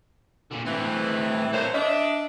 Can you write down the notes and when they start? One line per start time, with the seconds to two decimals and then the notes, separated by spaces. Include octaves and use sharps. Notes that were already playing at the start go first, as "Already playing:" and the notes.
0.51 A#2 D3
0.65 A2 E3 C4
1.52 A#2 A4 C5 C#5
1.73 D4 D#5 E5